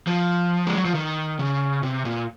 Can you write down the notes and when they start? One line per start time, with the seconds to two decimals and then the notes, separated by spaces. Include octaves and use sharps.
0.07 F3
0.67 G#3
0.75 F#3
0.85 F3
0.95 D#3
1.39 C#3
1.83 C3
2.05 A#2